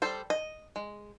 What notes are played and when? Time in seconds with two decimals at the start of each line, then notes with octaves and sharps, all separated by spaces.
0.02 G3 A4 C5
0.30 D#5
0.76 G#3